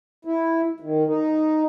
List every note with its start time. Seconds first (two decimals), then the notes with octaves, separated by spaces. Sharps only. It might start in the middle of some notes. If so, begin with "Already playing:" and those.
0.25 E4
0.80 D#3
1.07 D#4